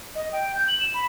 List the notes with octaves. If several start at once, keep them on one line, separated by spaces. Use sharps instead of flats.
D#5
G5
G6
F#7
E7
B5